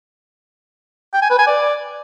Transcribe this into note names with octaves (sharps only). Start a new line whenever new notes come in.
G5
G#5
B4
G#5
D5